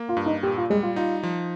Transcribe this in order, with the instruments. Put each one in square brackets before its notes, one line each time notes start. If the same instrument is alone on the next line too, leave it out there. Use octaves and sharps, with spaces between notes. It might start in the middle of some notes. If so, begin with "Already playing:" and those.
Already playing: [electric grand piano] A#3
[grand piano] F4
[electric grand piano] G2
[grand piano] D#4
[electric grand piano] A#2 [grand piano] G4
[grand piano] F4
[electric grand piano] G3 [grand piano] G#3
[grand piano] F4
[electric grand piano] D#4 [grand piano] F4
[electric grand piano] F3